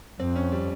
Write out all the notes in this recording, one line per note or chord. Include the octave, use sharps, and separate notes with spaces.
F2 C4
C#4
G3